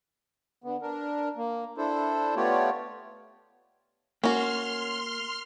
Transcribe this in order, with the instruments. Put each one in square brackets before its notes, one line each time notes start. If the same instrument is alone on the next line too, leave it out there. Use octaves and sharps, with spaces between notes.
[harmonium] D3 B3
D4 A#4
A#3
D4 E4 A4 C5
A3 B3 F4 G4 C#5 D5
[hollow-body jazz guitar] A#3 [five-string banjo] C#4 F#4 [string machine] C6 F6